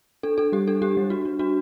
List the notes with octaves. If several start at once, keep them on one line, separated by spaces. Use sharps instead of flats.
D4 A4
D4 A4
G3 G4
D4 A4
D4 G4
G3
D4 F#4
D4
D4 F#4